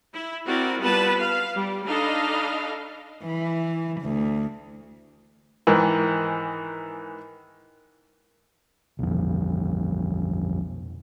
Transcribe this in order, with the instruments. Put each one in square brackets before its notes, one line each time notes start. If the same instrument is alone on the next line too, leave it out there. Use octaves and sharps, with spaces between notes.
[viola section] E4
C4 E4 F#4 A#4 D5
G3 B3 F4 B4 A5
F5
G3
D4 D#4 A4 D#5 F5 B5
[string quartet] E3
D2
[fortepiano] G#2 D#3 E3
[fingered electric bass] B1 F2